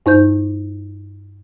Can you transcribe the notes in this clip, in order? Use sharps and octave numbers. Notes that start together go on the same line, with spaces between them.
G2 D#4 C5 G6